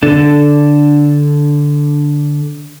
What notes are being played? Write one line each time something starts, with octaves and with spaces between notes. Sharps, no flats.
D3 D4 A4